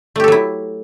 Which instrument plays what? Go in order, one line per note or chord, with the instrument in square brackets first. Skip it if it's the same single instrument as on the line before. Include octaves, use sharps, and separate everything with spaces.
[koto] A3
G4
A4
F#3
E4